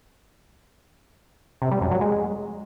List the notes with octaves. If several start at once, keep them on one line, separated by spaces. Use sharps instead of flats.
C3
G3
F#2
F#3
G#3